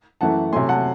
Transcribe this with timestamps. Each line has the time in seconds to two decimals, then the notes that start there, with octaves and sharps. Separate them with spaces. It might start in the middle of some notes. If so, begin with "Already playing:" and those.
0.21 F#2 E3 A3 F#5 A5
0.52 C3 F#3 A3 G#5 C6
0.69 F#5 A5